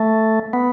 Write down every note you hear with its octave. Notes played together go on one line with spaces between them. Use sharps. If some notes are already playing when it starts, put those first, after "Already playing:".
Already playing: A3
B3